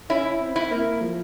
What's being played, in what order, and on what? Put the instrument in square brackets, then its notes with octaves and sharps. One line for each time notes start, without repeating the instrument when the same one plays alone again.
[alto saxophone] C#4 [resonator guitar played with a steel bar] E4
[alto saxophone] C4
[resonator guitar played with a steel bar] E4
[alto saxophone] A#3
F3